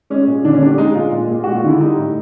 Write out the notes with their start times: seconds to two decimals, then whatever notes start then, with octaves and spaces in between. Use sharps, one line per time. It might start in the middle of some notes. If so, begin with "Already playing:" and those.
0.10 G#3 C#4
0.27 A#2
0.44 D3 D4
0.53 C#4
0.62 G3 D4
0.78 G#3 D#4
0.95 A#2 F4
1.12 G#3
1.30 A#2
1.44 G#3 F#4
1.55 F4
1.64 D3 E4
1.81 G3 D#4
1.97 A2